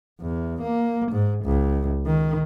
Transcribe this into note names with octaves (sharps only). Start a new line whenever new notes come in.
E2
A#3
G#2
C#2
D#3